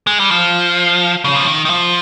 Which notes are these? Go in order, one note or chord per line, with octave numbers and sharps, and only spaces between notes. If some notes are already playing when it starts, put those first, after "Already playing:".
G#3
G3
F3
C#3
F3
D#3
D#3
F3